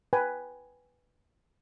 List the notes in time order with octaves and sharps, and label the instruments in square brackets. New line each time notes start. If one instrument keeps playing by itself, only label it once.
[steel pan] B4 G5 G#5